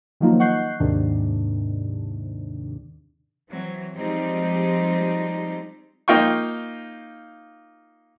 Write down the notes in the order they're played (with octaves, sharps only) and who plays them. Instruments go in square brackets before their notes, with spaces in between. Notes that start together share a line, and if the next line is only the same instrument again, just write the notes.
[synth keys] D#3 F3 F#3 A#3 D#4 F4
D#5 F#5 C#6 F#6 G6 C7
D#2 G#2 C3 D#3 D4
[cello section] E3 F#3 C4
F3 G3 G#3 C4 D#4 G4
[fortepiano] A#3 D#4 F4 G5 C#6